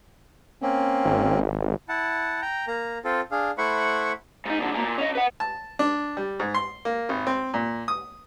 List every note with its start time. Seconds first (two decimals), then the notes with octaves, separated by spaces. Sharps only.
0.62 A#3 C4 C#4
1.05 G#1
1.89 E4 F#5 A5
2.42 G5 A#5
2.67 A#3 A#5
3.04 C4 F4 A4
3.31 D4 G#4 F5
3.58 A3 E4 C5 F#5 B5 C#6
4.45 G#2 D#4
4.59 A#2 D3
4.72 G#2 A#3
4.84 A#2
4.98 C#4 D#5
5.15 B4 F#5
5.40 A5
5.79 D4
6.17 G3
6.40 G#2
6.54 C6
6.85 A#3
7.09 G#1
7.27 C4
7.54 A#2
7.88 D#6